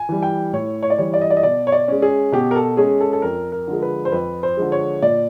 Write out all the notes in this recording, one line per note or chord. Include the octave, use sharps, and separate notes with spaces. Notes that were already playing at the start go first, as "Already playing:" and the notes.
Already playing: G#5
E3 G3
G5
A2 C#5
C#5
D5
E3 G3 C#5
D5
D#5
D5
D#5
B2 D5
C#5
D5
G#3 C#4
G#4
B2 G4
A#4
A4
G#3 C#4 G#4
A4
A4
F2 A#4
A#4
D3 F3 G#3
B4
C5
F2 B4
C5
D3 F3 G#3
C#5
A#2 D5